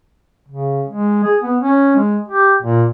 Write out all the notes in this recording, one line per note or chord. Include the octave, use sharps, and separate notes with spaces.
C#3
G#3
G#4
B3
C#4
G#3
G4
A#2